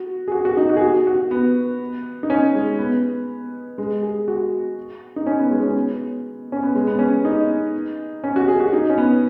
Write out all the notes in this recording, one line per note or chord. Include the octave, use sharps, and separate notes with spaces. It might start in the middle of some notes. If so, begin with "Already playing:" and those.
Already playing: F#4
G#4
F#4
F#4
D#4
F#4
G#4
F#4
F#4
B3
D#4
C#4
G#3
B3
G#3
G#4
F#4
D#4
C#4
B3
G#3
C#4
B3
C#4
B3
G#3
B3
C#4
D#4
C#4
F#4
G#4
F#4
D#4
C#4
B3